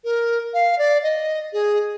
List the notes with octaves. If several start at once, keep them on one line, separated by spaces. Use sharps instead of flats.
A#4
F5
D5
D#5
G#4